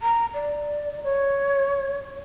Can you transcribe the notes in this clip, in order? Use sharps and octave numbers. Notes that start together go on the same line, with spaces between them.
A#5
D5
C#5